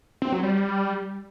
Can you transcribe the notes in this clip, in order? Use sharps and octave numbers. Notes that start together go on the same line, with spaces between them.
C4
F#3
G3
G3